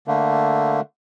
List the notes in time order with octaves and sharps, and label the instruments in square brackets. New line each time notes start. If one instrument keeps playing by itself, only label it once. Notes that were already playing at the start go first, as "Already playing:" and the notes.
[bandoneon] D3 A3 A#3